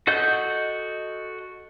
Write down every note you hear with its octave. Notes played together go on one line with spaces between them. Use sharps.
F#4 A4 D#5 F#5 G6